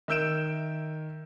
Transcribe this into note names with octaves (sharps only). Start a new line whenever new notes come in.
D#3 E5 E6 G6 D7 E7